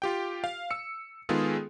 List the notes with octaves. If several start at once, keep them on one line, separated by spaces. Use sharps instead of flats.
F4 G4 G5
F5
E6 C#7
D#3 G#3 B3 F4 G#4 A4